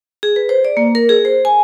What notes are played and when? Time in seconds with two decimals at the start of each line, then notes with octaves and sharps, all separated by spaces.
0.23 G#4
0.36 B4
0.49 C5
0.65 D5
0.77 A#3
0.95 A#4
1.09 G#4
1.25 C5
1.45 G#5